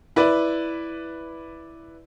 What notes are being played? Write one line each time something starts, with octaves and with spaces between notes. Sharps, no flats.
E4 B4 D5